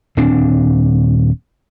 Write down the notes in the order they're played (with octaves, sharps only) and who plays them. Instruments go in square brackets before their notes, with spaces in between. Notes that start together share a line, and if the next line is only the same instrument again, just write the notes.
[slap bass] D#1 C4 D4